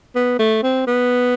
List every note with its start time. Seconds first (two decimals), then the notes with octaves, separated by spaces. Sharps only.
0.15 B3
0.39 A3
0.63 C4
0.87 B3